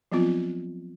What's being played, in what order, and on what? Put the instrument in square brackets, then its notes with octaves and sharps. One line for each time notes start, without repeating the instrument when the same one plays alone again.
[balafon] F3 F#3 B3 C4 F4